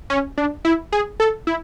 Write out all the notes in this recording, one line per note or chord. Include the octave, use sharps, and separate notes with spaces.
C#4
D4
E4
G#4
A4
E4